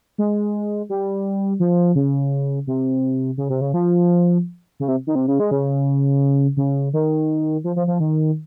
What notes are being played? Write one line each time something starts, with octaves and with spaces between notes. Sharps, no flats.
G#3
G3
F3
C#3
C3
C#3
C3
C#3
F3
C#3
C3
D#3
C3
C#3
G#3
C#3
C#3
D#3
F3
F3
F3
D#3